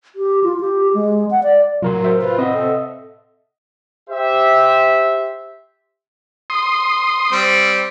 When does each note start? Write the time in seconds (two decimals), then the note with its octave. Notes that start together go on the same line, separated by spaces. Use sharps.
0.16 G4
0.44 F4
0.60 G4
0.94 G#3
1.31 F#5
1.43 D5
1.82 A2 C3 F#3 F4 A#4 C6
2.05 A#4 C5 E5
2.22 F4 B4
2.39 C4 D#5 E5 F#5
2.54 A4
4.10 G4 C5 E5
6.50 C6 D#6
7.32 G3 C4